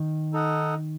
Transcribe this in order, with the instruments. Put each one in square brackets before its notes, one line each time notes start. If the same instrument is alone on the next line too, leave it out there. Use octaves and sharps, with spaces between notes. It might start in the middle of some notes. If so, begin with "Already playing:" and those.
Already playing: [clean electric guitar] D#3
[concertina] D#4 A4 D#5 F#5